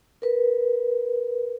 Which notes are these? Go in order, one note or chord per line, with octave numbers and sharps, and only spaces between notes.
A#4 B4